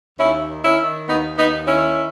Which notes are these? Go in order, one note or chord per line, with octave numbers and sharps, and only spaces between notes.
D#2 C#4 E4
D#3
C#4 E4
D#3
D#2 B3 D#4
D#2 B3 D#4
D#3 C#4 E4